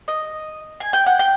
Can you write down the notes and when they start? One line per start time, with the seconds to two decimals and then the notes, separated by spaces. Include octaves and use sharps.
0.08 D#5
0.80 G#5
0.93 G5
1.06 F#5
1.19 G5